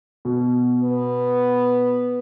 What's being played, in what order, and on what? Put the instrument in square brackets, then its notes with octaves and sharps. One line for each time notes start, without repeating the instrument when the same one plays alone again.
[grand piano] B2
[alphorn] B3